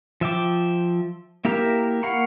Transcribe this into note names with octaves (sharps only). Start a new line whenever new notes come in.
F3 E5 G5 D6
A#3 E4 G4 A#4 E5
A#3 F5 F#5 B5 C#6